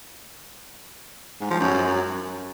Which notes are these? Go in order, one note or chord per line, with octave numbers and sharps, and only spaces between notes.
G#2
F3
F#2